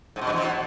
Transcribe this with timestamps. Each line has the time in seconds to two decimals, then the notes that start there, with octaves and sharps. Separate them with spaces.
0.16 G#2
0.21 B2
0.27 G2
0.32 E2
0.38 B2